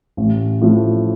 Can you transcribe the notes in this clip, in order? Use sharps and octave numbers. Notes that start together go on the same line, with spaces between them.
A1
A2 F3